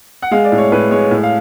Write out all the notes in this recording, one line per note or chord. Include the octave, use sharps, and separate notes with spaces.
F#5
G#3 F5
D5
A2
C#5
A2 B4
G#3 C#5
A2
F5